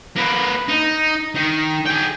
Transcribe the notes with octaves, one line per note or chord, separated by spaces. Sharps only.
A#3 B4
D#4
D#3
G#4 G5